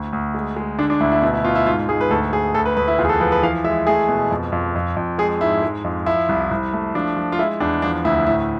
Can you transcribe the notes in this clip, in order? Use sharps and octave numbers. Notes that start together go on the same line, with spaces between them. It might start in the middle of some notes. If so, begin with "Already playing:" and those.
Already playing: D2
D2
G#3
G#3
D3 D4
D4
D2 E4
E4
B2 E4
E4
B2 F4
E4
G#2 F4
G#2 G#4
B4
D2 A4
D2 G#4
D2 A4
B4
D2 B4
E4
E2 F4
G#4
A4
F3 B4
B4
E3 F5
G#3 E5
A3 G#4
B2
F2
F2
F2
F2
G#3 G#4
G#2 E4
G#3
F2
F3 E4
C2
C2
A3
F3 D4
F3
F4
G#3 E4
E2 D4
F3 D4
D2 E4
A2 E4